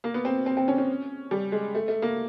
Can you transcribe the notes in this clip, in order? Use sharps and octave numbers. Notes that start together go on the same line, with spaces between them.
A#3
B3
C4
C4
C4
C#4
C#4
G3
G#3
A3
A3
A#3